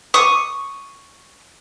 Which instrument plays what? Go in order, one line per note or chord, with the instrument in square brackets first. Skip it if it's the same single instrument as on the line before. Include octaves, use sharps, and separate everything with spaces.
[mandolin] C#6 D#6